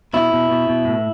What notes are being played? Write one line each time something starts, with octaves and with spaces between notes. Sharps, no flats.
B2 E4
B2
B2
B2
A2